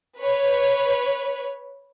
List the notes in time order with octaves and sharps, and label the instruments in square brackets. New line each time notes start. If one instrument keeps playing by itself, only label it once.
[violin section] B4 C#5